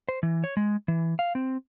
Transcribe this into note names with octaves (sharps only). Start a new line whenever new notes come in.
C5
E3
C#5
G#3
E3
F5
C4